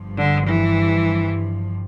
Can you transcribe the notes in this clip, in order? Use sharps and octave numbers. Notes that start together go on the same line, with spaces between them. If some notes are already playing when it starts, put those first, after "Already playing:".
Already playing: G1 G2 F3
D3
E3